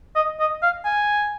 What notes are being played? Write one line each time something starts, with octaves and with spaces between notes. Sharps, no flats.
D#5
D#5
F5
G#5